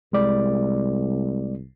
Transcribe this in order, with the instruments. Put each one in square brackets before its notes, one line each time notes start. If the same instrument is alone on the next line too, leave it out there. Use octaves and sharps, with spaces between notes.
[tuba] C2 [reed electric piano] G#3 D5